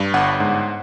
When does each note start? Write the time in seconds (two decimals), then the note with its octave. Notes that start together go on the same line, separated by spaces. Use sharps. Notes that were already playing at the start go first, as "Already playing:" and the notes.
Already playing: G2
0.14 G1 F#5
0.40 G#2